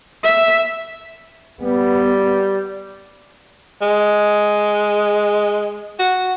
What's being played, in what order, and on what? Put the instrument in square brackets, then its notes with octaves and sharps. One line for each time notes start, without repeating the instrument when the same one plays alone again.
[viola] E5
[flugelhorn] G3 [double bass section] B3
[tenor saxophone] G#3
F#4